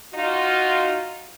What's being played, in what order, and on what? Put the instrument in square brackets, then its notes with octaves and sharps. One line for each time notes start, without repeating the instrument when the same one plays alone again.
[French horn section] D#4 F4 F#4